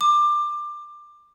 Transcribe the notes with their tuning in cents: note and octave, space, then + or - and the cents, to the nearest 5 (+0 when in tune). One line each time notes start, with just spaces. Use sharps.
D6 +20